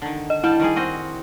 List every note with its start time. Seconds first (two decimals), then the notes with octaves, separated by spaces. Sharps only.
0.02 D3 D#3
0.30 D#5
0.44 G3 E4 G5 A5
0.60 D#3 G3 G#4
0.76 C4 F#4 D#5